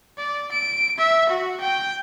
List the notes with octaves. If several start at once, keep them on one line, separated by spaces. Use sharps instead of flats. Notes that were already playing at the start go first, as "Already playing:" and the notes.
D5
D7
E5
F#4
G5